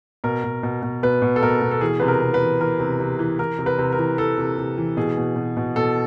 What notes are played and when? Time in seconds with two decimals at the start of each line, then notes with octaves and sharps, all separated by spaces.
0.24 B2 A#4
0.44 B2
0.63 B2
0.83 B2
1.03 B2 B4
1.22 B2
1.36 A4
1.42 B2 A#4
1.62 B2
1.71 A4
1.81 E3 G#4
2.00 C3 B4
2.08 A#4
2.22 C3
2.34 B4
2.41 E3
2.60 E3 A#4
2.80 C3
3.00 C3
3.19 E3
3.39 E3 A#4
3.59 C3
3.66 B4
3.79 C3
3.92 A#4
3.98 E3
4.18 E3 A4
4.38 C3
4.58 C3
4.78 E3
4.97 B2 G#4
5.17 B2
5.36 B2
5.57 B2
5.76 B2 A4